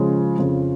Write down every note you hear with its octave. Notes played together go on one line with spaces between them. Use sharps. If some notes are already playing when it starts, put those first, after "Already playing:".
Already playing: C#3 F3 G#3
F2 C#3 F3